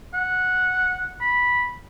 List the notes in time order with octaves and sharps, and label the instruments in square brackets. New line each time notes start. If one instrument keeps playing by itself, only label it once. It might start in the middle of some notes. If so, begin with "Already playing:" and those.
[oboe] F#5
B5